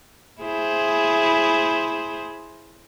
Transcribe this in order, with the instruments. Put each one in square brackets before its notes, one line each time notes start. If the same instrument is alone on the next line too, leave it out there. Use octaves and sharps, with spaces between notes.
[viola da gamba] E4 G#4 C5